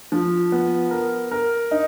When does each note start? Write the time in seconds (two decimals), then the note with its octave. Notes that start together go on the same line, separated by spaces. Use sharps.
0.12 F3
0.52 B3
0.91 A#4
1.31 A#4
1.71 D#4